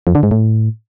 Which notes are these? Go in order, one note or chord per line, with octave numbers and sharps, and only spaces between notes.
F2
D3
G#2
A2